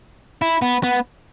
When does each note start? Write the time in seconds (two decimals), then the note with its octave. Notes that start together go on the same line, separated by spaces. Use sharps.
0.42 E4
0.62 B3
0.83 B3